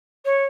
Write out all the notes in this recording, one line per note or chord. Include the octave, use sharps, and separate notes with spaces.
C#5